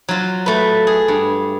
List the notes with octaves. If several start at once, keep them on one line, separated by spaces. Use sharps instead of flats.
F#3 F4
A3 B4
G#4
G2